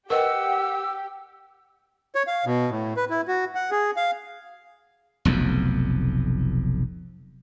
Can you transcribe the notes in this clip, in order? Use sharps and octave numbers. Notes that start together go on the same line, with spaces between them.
G4 A#4 B4 D#5 F#5 E6
C#5
F5
B2
A2
B4
E4
F#4
F#5
G#4
F5
F1 B1 F2